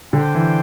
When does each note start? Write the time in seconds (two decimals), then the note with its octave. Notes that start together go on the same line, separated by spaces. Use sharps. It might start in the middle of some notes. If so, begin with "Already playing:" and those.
0.13 D3 D4 C5 G5
0.35 E3